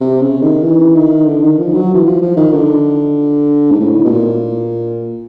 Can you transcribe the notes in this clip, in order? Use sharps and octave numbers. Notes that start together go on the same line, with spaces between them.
C3
C#3
D#3
E3
D#3
D3
D#3
F3
F#3
E3
F3
F3
D#3
D3
G#2
A2
B2
A#2